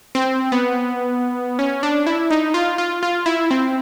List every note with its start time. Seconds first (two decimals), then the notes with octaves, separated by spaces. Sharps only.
0.15 C4
0.52 B3
1.59 C#4
1.83 D4
2.07 E4
2.30 D#4
2.54 F4
2.78 F4
3.03 F4
3.26 E4
3.51 C4